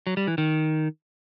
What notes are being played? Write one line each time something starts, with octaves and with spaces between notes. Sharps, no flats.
F#3
G3
E3
D#3